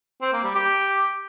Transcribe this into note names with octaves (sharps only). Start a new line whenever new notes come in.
C4
A#3
G3
G4